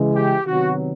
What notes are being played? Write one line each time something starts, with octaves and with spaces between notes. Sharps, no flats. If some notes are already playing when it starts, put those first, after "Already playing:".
Already playing: C#3 E3 G#3
G4
C3 D#3 F#3 B3 F#4